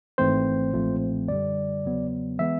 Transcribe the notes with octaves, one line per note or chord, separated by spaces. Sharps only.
G#1 G#2 E3 A3 C4 C5
B1 A#2 F3 A3 C4
F#2 D3 G3 D5
E2 C#3 F#3 B3
E3 G#3 B3 E5